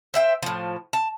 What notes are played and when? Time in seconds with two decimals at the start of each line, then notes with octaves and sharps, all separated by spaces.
0.14 C5 E5 G5
0.42 A2 F3
0.93 A5